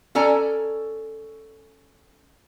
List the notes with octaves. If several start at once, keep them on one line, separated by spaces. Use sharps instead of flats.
C#4 A4 D5 G#5 A#5